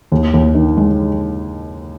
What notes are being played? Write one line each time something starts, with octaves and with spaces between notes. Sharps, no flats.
D#2
D#2
D#3
G#3